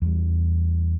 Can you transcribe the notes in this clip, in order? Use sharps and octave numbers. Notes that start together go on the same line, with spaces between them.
E2 G3